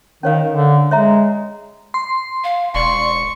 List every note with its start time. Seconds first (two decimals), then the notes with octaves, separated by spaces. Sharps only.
0.23 D#3 C#4 C#5 F5
0.52 D3
0.91 G#3 C#5 E5 A#5
1.94 C6
2.44 F5
2.75 E1 D5 C6 C#6